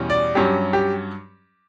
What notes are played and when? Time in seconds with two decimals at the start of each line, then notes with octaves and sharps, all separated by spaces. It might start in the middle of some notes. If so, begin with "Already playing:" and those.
Already playing: E2 B2 G3 C#4
0.10 D5
0.35 G2 F#3 C#4 G4
0.73 G4